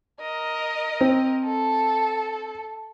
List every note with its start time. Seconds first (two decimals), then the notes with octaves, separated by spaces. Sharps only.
0.20 A#4 D#5
1.01 C4
1.45 A4